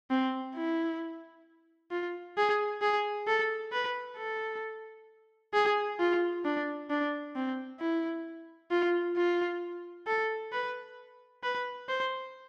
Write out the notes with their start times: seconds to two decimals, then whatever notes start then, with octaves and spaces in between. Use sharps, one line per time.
0.10 C4
0.55 E4
1.91 F4
2.37 G#4
2.82 G#4
3.27 A4
3.72 B4
4.17 A4
5.54 G#4
6.00 F4
6.45 D4
6.90 D4
7.35 C4
7.80 E4
8.71 F4
9.17 F4
10.07 A4
10.52 B4
11.43 B4
11.89 C5